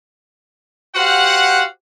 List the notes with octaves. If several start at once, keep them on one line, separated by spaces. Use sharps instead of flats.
F#4 G4 C5 F5 F#5